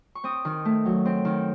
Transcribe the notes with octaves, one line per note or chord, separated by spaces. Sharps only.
C#6
C4 D#6
D#3
A3
F#3
C4
D#3